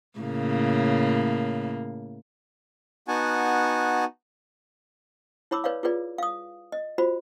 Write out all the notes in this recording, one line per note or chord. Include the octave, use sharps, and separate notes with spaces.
A2 C#3 A#3
B3 D#4 F#4 F#5 G#5 A5
E4 C#5 B5 D6 E6
B4 C#5 D5 F5
F4 G#4 B4 D5
F5 D#6
D#5
F4 F#4 C5 B5